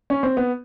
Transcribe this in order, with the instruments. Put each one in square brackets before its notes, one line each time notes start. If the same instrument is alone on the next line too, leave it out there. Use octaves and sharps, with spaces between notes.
[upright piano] C#4
C4
B3